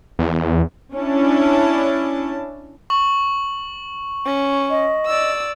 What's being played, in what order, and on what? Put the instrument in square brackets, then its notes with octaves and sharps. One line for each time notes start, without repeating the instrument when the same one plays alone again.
[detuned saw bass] E2
[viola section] C#4 D4 E4 A5
[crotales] C#6 F#7
[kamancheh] C#4
[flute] D#5
[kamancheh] D5 E6